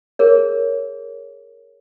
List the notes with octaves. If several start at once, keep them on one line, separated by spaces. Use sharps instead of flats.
G#4 A#4 C#5